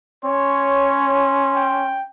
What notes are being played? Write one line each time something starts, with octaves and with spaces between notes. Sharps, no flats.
C#4 C#5 C6
G5